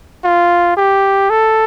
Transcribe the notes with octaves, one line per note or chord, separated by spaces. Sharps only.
F4
G4
A4